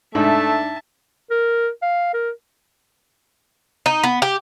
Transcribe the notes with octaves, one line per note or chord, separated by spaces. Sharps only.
G#2 A3 D4 E5 A5
A#4
F5
A#4
D#4
B3
G4